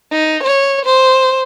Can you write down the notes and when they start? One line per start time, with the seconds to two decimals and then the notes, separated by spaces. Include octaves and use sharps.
0.12 D#4
0.43 C#5
0.85 C5